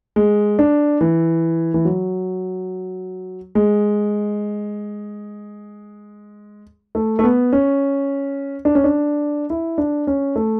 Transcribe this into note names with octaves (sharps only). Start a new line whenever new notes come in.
G#3
D4
E3
E3
F#3
G#3
A3
A3
B3
C#4
D4
C#4
D4
E4
D4
C#4
A3